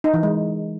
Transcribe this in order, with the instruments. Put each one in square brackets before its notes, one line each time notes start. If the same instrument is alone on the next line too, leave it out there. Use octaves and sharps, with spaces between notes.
[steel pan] D#4
E3
G#3